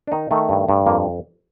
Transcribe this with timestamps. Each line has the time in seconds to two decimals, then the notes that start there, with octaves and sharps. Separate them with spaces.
0.07 D4
0.12 D#3 D#4
0.31 D#3 A3
0.49 G2
0.68 G2
0.86 F2 A#3